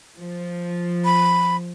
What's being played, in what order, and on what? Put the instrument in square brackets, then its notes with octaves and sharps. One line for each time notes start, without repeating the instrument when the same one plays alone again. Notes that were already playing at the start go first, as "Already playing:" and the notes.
[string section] F3
[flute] B5